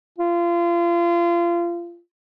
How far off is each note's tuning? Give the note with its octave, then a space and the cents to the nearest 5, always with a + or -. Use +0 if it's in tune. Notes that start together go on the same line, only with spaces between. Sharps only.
F4 -30